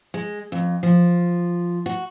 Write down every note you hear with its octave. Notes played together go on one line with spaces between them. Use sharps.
G#3
F2
F3
F#4